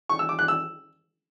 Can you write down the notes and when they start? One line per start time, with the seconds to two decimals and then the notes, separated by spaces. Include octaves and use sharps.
0.09 C#6
0.19 E6
0.29 D6
0.39 F#6
0.48 E6